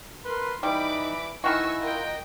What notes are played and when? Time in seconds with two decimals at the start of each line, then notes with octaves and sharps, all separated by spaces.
0.25 A#4 B4 C6
0.63 E3 G3 D#4 B5 D6
1.44 D#3 E3 E4 F#4 G#5 C#6 E6
1.80 F4 A#4 D#5 G5